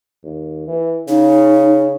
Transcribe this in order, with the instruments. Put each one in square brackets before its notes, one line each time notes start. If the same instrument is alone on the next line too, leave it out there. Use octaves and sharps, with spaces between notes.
[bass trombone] D#2
E3
[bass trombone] C#3 [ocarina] D#4